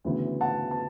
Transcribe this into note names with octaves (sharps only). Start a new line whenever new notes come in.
D2 C#3 E3 B3
F#5 A5
A5